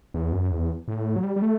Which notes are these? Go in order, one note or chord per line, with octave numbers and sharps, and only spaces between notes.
E2
F#2
E2
A2
F#3
G3
G3
A3